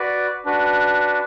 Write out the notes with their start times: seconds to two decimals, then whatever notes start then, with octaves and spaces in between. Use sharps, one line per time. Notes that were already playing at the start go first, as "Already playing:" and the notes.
Already playing: F#4 B4 D5
0.45 D4 F#4 B4